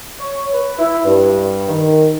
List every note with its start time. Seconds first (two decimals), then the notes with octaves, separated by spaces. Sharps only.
0.20 C#5
0.53 B4
0.79 E4
1.05 G2
1.68 D#3